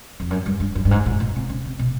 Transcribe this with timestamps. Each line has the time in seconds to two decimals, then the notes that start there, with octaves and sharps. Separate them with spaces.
0.20 F2
0.30 F#2
0.46 G2
0.60 G2
0.75 F#2
0.85 G2
0.91 G#2
1.06 A2
1.20 A#2
1.36 C3
1.49 C#3
1.65 C3
1.79 B2